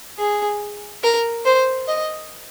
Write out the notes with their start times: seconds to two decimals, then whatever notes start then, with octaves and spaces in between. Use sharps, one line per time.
0.18 G#4
1.04 A#4
1.45 C5
1.88 D#5